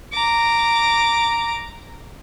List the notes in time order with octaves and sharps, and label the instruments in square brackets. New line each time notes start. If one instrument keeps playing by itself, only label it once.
[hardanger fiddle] A#5 D6